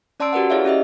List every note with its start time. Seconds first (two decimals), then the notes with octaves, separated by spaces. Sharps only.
0.20 C#4 D5 A5 C6 E6 D7
0.33 F#4 G4 A#4 B4 D5 F#5
0.50 E4 G#4 C#5 D5 E5 F5
0.65 C#4 G4 D#5 E5